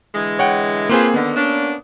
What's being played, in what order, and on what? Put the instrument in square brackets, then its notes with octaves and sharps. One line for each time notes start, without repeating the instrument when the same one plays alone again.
[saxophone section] D3 E3 G#3
[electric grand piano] C#5 F#5 G5
[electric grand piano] A#3 C4 G#4 [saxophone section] F4 B4 C5
[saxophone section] D3 D#3 [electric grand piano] B3
[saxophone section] A#3 C#4 D4